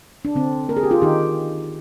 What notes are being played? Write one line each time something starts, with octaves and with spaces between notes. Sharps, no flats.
D4
D3 C4
A#3 A#4
G#4
G4
F4 G#4
D#3 D#4 G4